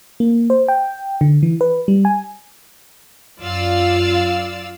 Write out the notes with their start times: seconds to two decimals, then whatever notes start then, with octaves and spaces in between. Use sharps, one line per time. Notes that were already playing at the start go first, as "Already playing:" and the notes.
0.20 A#3
0.50 C5
0.68 G5
1.21 D3
1.43 E3
1.61 B4
1.88 G3
2.05 G#5
3.40 F#2 F4 D5 F5 E6